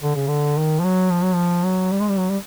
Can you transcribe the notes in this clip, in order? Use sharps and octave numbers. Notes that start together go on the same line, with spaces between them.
D3
C#3
D3
D#3
F3
F#3
F3
F#3
F3
F#3
G3
G#3
G3
F#3
G3